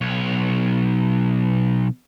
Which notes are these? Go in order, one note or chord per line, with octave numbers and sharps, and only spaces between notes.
B1 C#5